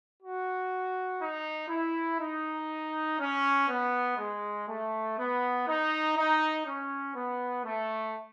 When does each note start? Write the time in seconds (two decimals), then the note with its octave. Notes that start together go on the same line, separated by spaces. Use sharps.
0.22 F#4
1.21 D#4
1.70 E4
2.20 D#4
3.20 C#4
3.69 B3
4.18 G#3
4.68 A3
5.18 B3
5.67 D#4
6.16 D#4
6.67 C#4
7.15 B3
7.65 A3